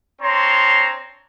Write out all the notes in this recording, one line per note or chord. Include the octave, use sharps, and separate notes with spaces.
C4 D4 C#5 A#5 C6